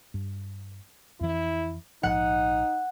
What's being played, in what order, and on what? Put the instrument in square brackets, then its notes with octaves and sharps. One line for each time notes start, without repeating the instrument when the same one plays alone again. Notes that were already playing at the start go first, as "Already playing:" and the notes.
[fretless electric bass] G2
[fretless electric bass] F2 E3 [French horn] E4
[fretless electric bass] A#1 G#2 F3 [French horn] D#4 [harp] F#5